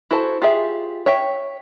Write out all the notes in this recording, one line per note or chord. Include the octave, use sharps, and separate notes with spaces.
E4 F#4 A4 C5 A5
F4 G4 G#4 E5
C#5 E5 G5